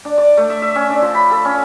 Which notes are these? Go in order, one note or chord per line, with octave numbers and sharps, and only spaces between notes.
D4
D5
A3
E5
E5
C#4
D4
F3
B5
A4
C#4